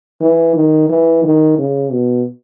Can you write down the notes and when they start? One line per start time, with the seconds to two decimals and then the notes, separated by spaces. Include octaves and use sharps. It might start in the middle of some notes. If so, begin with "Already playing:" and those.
0.21 E3
0.56 D#3
0.90 E3
1.24 D#3
1.59 C#3
1.92 B2